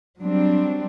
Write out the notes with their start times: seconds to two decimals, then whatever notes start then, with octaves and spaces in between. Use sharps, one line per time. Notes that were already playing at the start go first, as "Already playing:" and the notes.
0.21 F#3 G3 C4 D4